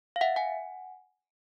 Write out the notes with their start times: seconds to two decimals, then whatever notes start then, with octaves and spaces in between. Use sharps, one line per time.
0.16 F5
0.21 E5 F#5
0.36 F#5 G#5